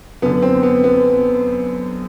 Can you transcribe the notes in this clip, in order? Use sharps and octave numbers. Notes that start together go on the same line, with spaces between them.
F#2 D3 B3
C4
B3
B3